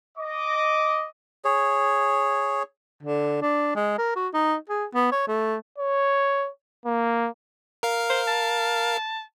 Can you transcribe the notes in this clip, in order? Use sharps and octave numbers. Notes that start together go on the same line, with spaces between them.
D#5 D6
G#4 C#5
D3
D4
G#3
A#4
F#4
D#4
G#4
B3
C#5
A3
C#5
A#3
A#4 F5
C5
A5